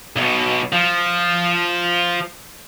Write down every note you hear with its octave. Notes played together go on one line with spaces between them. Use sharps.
B1 B2
F3